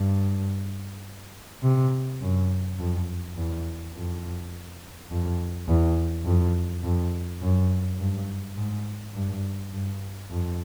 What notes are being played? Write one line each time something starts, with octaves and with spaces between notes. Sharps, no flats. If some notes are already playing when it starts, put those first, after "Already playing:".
Already playing: G2
C3
F#2
F2
E2
F2
F2
E2
F2
F2
F#2
G2
G#2
G2
G2
F2